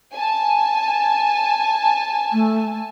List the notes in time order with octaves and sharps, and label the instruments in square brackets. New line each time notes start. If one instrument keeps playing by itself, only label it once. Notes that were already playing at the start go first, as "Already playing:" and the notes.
[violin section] G#5 A5
[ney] A3